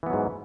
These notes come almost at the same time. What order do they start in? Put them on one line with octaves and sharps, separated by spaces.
E3 B3 F#3 G#2